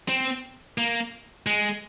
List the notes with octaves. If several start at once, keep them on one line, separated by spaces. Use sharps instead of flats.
C4
A#3
G#3